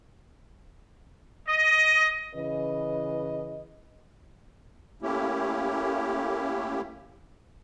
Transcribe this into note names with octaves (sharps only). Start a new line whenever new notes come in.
D#5
C#3 E3 B4 D#5
A3 A#3 C#4 E4 G4